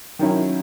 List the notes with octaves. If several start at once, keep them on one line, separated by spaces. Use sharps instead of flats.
D#3 F#3 C#4 E4